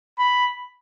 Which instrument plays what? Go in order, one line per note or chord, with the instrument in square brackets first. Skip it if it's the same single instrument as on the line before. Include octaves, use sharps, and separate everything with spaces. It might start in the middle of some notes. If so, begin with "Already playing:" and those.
[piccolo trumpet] B5